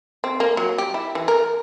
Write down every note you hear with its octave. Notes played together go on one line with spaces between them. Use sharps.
C4
A#3
F#3
G4
E4
E3
A#4